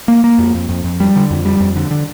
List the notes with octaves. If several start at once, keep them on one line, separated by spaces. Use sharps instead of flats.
A#3
A#3
F2
F2
F2
F2
G3
D3
F2
G3
F2
D3
D3